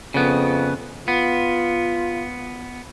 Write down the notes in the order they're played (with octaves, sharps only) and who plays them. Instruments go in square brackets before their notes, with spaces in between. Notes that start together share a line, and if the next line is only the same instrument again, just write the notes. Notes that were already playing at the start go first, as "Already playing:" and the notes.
[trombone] F2 [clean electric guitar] C#3 B3
[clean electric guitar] B3 [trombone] F4